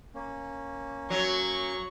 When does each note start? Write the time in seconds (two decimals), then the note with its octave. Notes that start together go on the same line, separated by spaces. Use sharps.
0.15 A#3 C#4
1.10 F#3 C#6